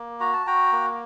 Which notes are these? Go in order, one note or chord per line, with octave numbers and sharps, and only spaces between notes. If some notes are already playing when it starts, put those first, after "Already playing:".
Already playing: A#3
F#4 A#5
A5
F#4 G5 A#5
A#3